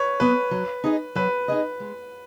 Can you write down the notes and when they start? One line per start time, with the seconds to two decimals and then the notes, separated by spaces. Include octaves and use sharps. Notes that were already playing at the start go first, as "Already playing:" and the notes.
Already playing: B4 C#5
0.20 F#3 B3 B4
0.51 F#3
0.84 D#4 G#4 D#5
1.15 F#3 B4
1.48 D#4 G#4 D#5
1.80 G#3